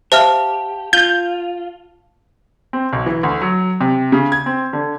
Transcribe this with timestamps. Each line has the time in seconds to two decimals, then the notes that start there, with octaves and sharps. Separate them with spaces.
0.12 G4 C5 E5 F5 A5 F6
0.93 F4 G6
2.73 C4
2.93 B1
3.06 E3
3.23 D2
3.42 F#3
3.81 C3
4.12 C#3
4.32 G#6
4.46 C4
4.73 D3